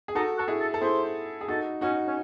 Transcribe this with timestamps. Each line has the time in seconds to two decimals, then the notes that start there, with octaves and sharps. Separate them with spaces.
0.08 G#4
0.15 D#4 F#4 A4
0.37 F#4 A4
0.48 E4 G#4
0.60 A4
0.74 A4
0.82 E4 G#4 C5
1.41 G#4
1.48 D#4 F#4 A4
1.81 C#4 D#4 F#4
2.07 C#4